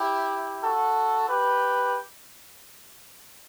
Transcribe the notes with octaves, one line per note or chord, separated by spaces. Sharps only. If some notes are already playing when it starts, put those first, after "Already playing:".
Already playing: E4 G4
F#4 A4
G4 B4